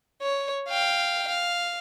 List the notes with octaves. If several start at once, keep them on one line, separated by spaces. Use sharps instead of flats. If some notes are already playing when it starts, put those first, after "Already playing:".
C#5
F5 G5
F5